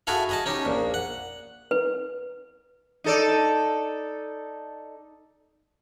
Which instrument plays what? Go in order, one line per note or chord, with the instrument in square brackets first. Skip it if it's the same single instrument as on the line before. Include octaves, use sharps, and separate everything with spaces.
[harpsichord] E4 F#4 G#4 A4 F5
G#4 D#5 A5
C#4 D#4 G4
A#1 A#2
F#5
[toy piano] B4
[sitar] D#4 A4 D5